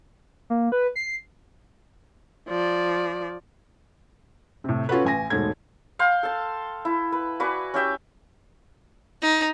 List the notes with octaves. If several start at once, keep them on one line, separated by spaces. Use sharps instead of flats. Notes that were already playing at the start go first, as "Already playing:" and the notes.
A#3
B4
C7
F3 D5
A2 C3
C#4 F4 F#4 A4 B4
A1 G#5 A#6
E1 G#2 A3 G#6
F5 G5 C6
A4 A5
E4
B4
F#4 B4 D5 G#5
C#4 G4 E5 G5
D#4